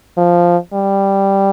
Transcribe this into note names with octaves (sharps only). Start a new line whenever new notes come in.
F3
G3